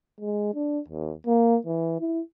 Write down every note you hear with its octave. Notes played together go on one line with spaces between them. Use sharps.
G#3
D4
D#2
A#3
E3
E4